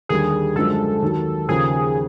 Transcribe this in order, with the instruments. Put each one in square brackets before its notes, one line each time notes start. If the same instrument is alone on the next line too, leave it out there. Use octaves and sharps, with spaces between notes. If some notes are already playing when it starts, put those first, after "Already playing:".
[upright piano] D#2 D3 G3 [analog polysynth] G#4
[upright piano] F#2 D3 F3 G#3 [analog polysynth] A4
[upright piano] D#2 D#3 F#3
[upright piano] D#2 C#3 F3 [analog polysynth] G#4